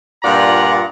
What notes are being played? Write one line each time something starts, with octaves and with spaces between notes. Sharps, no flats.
G2 A#2 F4 D5 F#5 A#5